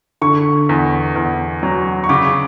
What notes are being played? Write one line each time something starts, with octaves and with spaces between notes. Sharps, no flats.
D3 C#6
E2
E2
F#3
C#6
C#3 D6